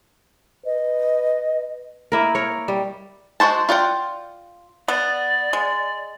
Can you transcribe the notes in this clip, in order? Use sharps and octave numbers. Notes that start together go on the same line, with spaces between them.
B4 D#5
A#3 E4 A#4
A#4 C#5
G3
G#3 F#4 C5 A5
F4 D5 F#5 G5
B3 D5
G#3